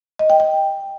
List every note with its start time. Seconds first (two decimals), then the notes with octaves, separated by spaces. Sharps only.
0.19 D#5
0.30 G5
0.40 G5